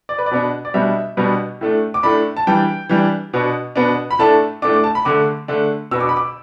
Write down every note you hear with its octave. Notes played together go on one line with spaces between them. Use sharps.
D5
B4
D5
B2 B3 D4
D5
B2 G3 B3 D4 E5
B2 G3 B3 D4
A2 A3 D4
D6
A2 A3 D4 B5
A5
E3 G3 D4 G5
E3 G3 D4
B2 B3 D4
B2 B3 D4
B5
A2 A3 D4 A5
A2 A3 D4 D6
D6
A5
B5
D3 A3 D4 D6
D3 A3 D4
B2 B3 D4 E6
D6
B5
D6